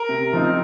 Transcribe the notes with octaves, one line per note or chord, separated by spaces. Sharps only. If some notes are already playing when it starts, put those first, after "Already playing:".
Already playing: A#4
C3
F3 C4 D#4